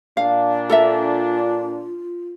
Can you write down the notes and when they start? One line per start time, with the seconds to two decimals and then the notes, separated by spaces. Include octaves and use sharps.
0.17 A#2 D4 F5
0.70 F4 A4 A#4 E5